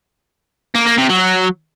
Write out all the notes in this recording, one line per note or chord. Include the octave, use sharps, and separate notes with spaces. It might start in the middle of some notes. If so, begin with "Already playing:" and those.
A#3
A#3
C3
F#3